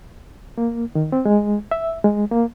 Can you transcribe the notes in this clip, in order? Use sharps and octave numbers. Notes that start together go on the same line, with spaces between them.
A#3
D#3
C4
G#3
E5
G#3
A#3